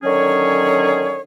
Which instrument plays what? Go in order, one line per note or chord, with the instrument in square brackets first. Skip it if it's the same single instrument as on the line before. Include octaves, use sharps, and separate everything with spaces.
[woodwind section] D3 D#3 F#3 C#4 G#4 C#5